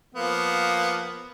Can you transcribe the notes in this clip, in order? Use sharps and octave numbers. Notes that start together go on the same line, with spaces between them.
F3 A#3 B3